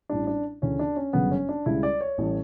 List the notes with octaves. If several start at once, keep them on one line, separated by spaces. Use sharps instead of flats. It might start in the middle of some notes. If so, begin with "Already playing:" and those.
A1 A2 G3 D4
D4
D2 C#3 E3 C#4
D4
C#4
G1 F#2 C#3 F#3 B3
C#4
D4
C#2 C#3 G3 E4
D5
C#5
A1 A2 E3 G3